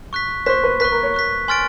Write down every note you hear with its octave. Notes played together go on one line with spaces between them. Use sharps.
C#6 F#6 B6
C5 C#6 F#6 B6
B4
B4 C#6 F#6 B6
A#4
C#5
C#6 F#6 B6
G#5 C6 F6 A6 D7